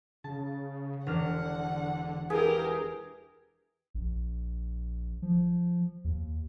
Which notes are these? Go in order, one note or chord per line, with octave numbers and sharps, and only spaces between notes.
C#3 A5
E1 D3 D4 F#5 F6
E4 G4 G#4 A#4 B4
A#1
F3
D#2